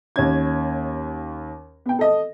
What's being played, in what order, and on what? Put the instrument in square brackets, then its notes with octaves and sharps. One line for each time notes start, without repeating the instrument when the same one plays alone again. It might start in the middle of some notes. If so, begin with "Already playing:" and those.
[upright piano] D#2 C#4 G#6
B3 G5
A4 D#5